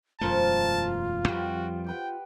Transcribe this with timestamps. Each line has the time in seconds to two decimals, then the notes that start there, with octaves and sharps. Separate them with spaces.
0.21 E1 F#2 A3 F4 A#4 C5 A5 E6
1.28 F2 F3 G3 F#4 G4 B4
1.87 G4 B4 F#5 G5